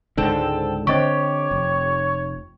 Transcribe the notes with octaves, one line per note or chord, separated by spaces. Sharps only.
C#2 G#2 D3 C4 A4
D3 C4 G4 C5 C#5 D#5 C#6
F1